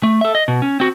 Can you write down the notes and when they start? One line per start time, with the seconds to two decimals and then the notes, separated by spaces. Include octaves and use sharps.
0.03 A3
0.21 A4 E5
0.35 D#5
0.48 B2
0.62 C#4
0.80 C4 F#4